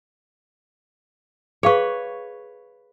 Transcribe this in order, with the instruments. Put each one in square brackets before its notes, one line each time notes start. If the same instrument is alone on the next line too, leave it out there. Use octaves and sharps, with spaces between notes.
[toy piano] G#4 F5 C#6 [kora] B4 C#5